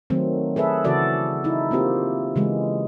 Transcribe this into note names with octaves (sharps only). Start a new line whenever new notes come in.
D#3 F#3 A3 C4
G#4 A4 B4 E5
C#3 E3 F#4 A4 D5
D#4 E4
A#3 C4 F4 G4
C#3 E3 G#3